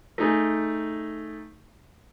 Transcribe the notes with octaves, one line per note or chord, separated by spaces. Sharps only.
A3 D#4 G#4